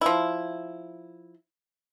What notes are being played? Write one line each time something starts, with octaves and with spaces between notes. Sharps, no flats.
F3 E4